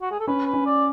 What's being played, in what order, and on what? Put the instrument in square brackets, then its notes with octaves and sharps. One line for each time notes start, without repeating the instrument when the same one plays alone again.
[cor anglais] F#4
G#4
A4
[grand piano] C#4 [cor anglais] B4
[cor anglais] B4
[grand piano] C#4
[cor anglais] D5